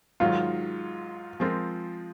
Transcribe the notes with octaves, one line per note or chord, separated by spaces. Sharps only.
G#2 D#3 F#3 F4
F3 G#3 C4 F4 A#4